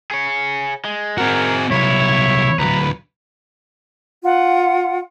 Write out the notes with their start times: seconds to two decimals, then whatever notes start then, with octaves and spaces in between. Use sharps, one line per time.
0.11 G#4 C#5
0.85 G#3
1.18 C4 F#4 G#4 A#4 F#5
1.71 C2 F#3 E4 C#5
2.59 D2 F#3 B4 A#5
4.23 F4 F#5